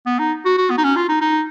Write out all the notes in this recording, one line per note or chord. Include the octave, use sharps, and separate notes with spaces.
B3
D#4
F#4
F#4
B3
D#4
C#4
F4
D#4
D#4